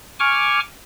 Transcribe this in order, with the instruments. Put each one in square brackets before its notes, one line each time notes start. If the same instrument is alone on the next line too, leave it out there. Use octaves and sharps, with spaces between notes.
[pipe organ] G#5 C#6 D6 F6